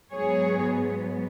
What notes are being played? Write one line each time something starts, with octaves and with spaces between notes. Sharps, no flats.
G#2 F#3 B3 G#4 C#5